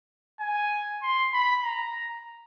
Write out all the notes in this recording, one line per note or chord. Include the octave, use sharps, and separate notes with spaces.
G#5
C6
B5
A#5